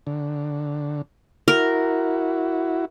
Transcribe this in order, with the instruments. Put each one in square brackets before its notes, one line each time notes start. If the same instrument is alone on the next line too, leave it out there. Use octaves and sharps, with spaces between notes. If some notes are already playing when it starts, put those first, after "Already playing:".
[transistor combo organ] D3
[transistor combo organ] E4 F#4 [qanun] A#4